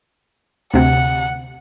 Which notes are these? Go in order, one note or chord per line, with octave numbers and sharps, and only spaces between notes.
D2 C3 F#5